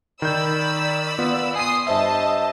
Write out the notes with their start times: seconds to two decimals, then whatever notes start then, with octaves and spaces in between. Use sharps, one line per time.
0.22 D#3 D5 B5 E6 G6
1.19 B3 F4
1.56 G#5 C6 D#6 C7 D#7
1.87 G2 C5 D#5 E5 A5